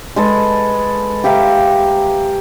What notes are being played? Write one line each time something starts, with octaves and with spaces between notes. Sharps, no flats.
G#3 A4 B4
G4 E5 F5 A#5